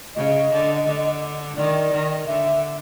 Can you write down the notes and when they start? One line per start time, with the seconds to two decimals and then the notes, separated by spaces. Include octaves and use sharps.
0.15 C#3 D#5
0.51 D3
0.87 D3
1.57 D#3 D5
1.93 D#3
2.27 D3 E5